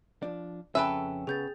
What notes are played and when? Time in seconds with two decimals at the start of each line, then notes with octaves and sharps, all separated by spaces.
0.22 F3 D4
0.75 F2 C#3 C#4 A4 B4 E5 G5 G#5
1.27 C#3 B3 G#4 G6 A6